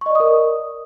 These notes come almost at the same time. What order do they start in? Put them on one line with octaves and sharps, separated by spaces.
C#6 D#5 D5 D#6 A#4